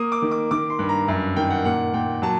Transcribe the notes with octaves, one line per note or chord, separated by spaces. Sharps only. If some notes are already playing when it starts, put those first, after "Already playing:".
Already playing: A#3 D#6
D6
D#3
D6
D#3 D6
C6
G2
A#5
F#2
D#3 G5
F#5
A#2 F#5
A#2 G5
F#3 A5